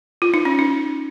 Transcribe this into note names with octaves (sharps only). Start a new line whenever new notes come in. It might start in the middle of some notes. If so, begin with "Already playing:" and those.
F4
D#4
C#4
D#4